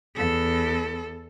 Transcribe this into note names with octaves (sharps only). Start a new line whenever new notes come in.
E2 A4